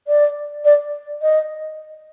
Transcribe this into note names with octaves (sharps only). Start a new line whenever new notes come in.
D5
D5
D#5